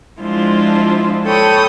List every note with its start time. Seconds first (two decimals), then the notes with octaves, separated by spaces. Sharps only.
0.19 F3 G#3 D4 E4 F4 C5
1.24 A4 C#5 G5 B5 D#6